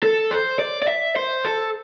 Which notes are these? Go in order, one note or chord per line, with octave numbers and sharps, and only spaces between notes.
A4
C5
D5
D5
E5
C5
A4